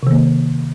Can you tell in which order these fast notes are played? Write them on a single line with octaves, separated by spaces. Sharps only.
C3 D#3 A#3